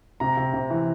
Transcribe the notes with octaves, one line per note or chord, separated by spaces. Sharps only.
C3 A#5
C3
C3
E3